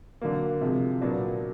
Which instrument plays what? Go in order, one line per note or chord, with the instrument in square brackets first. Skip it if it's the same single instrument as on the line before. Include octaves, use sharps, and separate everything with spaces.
[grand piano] D3 F#3 A#3
C3 F3 G#3
A#2 F#3 B3 D4